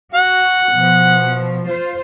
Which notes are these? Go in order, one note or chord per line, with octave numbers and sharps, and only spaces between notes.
F#4 F#5
B2 F3
F4 C5